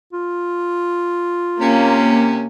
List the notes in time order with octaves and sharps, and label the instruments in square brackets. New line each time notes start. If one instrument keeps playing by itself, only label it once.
[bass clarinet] F4
[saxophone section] C3 C#4 [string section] A#3